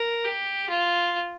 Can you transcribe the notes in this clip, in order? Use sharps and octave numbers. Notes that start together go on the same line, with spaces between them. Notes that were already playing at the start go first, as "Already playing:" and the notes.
Already playing: A#4
G4
F4